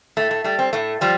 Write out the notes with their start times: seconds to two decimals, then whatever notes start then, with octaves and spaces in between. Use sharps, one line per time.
0.17 A2 A3
0.31 A3
0.44 G3 A3
0.59 C4
0.73 A2 A3
1.01 F3 G3